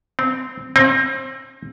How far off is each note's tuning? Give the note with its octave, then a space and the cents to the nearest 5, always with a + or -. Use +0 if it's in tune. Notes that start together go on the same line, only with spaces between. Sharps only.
C4 -10
C4 +30